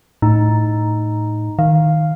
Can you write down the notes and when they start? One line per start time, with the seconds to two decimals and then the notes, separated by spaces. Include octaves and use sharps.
0.22 A2 D#4
1.59 D#3 F5